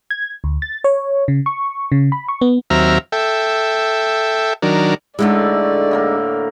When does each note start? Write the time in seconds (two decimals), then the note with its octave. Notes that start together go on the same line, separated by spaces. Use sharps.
0.10 G#6
0.44 D2
0.62 A6
0.84 C#5
1.28 C#3
1.46 C#6
1.92 C#3
2.12 B5
2.28 C#6
2.41 B3
2.70 D#2 F#3 C4 E5 A#5 F6
3.12 A4 E5 G5
4.62 D#3 F#3 D4 A#4
5.19 A2 D3 G#3 A3 D4 D#4 D5
5.91 A2 A#3 A#4